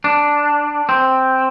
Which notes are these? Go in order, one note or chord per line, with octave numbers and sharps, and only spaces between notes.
D4
C4